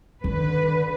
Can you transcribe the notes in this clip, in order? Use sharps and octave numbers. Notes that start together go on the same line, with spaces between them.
D3 D#3 B4